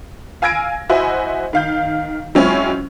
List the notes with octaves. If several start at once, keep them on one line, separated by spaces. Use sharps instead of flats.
F5 G#5 E6 G#6 A#6 D7
E4 F#4 C5 D#5 E5 G#5
D#3 F5 G6
F#3 G#3 C4 C#4 E4 F4